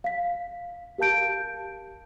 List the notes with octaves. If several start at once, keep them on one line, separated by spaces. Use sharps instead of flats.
F5 B6
G4 A#4 F5 A5 G6 D7